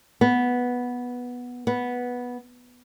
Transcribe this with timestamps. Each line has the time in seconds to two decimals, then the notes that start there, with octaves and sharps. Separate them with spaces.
0.21 B3
1.67 B3